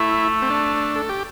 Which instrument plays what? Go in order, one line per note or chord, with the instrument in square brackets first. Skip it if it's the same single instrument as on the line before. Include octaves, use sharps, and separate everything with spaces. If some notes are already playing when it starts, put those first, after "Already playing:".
Already playing: [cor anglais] A3 [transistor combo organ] E4
[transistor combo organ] C4
D4
A4
G4